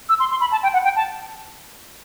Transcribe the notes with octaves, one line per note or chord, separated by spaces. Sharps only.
E6
C6
C6
B5
A5
G5
F#5
G5
A5